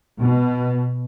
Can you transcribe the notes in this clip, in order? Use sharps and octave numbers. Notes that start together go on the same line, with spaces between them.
B2